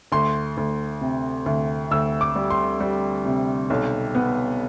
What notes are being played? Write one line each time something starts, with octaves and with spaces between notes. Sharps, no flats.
D2 C6
D2
C3
D2
D2 E6
D6
G3
C6
G3
C3
B1
B3